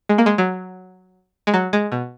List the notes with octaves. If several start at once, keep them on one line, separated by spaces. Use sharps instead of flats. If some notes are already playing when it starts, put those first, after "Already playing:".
G#3
A#3
G#3
F#3
G#3
F#3
G#3
B2